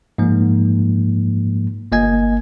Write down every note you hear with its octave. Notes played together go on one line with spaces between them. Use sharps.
G#2 F3 A#3
G1 A#3 D#5 G#5 G#6